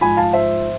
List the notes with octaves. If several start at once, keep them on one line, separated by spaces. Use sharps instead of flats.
G#2 F3 G#5 B5
F5 A5
C5 E5